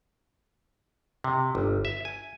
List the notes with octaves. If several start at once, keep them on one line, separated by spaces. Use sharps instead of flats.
C3
G1
E5
G#5